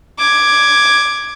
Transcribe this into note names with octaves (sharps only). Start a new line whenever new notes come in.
D6 G#6